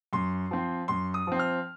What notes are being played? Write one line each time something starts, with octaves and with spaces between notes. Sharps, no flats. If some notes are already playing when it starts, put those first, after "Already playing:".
F#2 C6
F3 C4
F#2 C6
D#6
F3 C4
F6